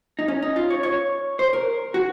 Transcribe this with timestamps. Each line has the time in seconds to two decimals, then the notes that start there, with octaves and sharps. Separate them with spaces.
0.19 D#4
0.28 C#4
0.42 D#4
0.56 F4
0.70 C#5
0.83 C#5
1.39 C5
1.53 A#4
1.94 F#4